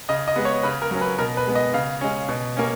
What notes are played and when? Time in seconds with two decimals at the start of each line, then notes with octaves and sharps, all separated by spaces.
0.09 C#3 D#5
0.28 D#5
0.36 G#3 B3
0.45 C#5
0.63 C#3 B4
0.82 A#4
0.91 F#3 C#4
1.01 B4
1.18 B2 A#4
1.37 B4
1.46 G#3 B3
1.55 D#5
1.73 C#3 F5
2.01 G#3 C#4
2.28 B2
2.57 A#3 C#4